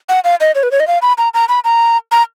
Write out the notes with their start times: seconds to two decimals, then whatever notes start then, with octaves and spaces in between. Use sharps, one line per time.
0.09 F#5
0.24 F5
0.41 D#5
0.55 C#5
0.63 B4
0.71 C#5
0.80 D#5
0.87 F5
1.02 B5
1.18 A#5
1.34 A#5
1.49 B5
1.64 A#5
2.12 A#5